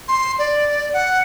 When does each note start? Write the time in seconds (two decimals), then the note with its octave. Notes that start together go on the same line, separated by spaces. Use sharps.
0.08 C6
0.39 D5
0.93 F#5